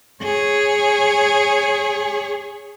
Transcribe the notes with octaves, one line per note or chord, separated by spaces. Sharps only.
G#4 C#5